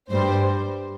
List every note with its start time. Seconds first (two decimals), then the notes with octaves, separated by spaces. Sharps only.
0.10 G2 G3 C5